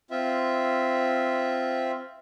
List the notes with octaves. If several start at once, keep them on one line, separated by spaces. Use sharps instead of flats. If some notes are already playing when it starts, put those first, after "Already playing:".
C4 F4 E5